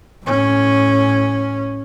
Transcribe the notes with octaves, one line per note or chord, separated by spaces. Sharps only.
A2 C#4